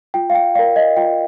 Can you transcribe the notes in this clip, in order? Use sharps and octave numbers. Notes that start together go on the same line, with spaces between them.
F4 G5
F5
G5
A#4 D5 F5
D#5
F4 G5